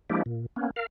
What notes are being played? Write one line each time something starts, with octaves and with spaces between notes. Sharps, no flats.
F3 G#3 A#3 D4 E4 G4
A#2
A#3 B3 C#4
A#4 F5